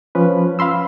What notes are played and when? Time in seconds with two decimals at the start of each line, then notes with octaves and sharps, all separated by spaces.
0.15 F3 C#4 B4
0.59 F5 B5 C6 E6